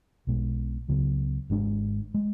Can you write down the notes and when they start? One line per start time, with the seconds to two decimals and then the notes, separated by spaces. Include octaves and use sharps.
0.27 B1 B2 G#3
0.89 C#2 C#3 F#3 B3
1.50 G#1 G#2 G#3 D4
2.14 G#3